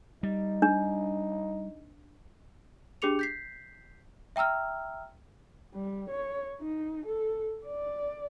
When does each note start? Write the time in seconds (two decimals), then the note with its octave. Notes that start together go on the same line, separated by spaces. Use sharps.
0.23 G3 D#4
0.62 D4
3.02 D4 G4 G#4 D6 C#7 F7
3.19 G6 B6 C7
4.36 E5 G5 A#5 E6 F6
5.74 G3
6.10 C#5
6.61 D#4
7.06 A4
7.66 D5